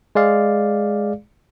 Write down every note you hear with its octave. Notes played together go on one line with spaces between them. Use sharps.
G#3 G#4 D5 F5